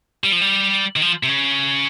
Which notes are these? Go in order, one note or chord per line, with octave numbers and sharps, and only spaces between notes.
G3
F3
G3
D#3
F3
C3
C#3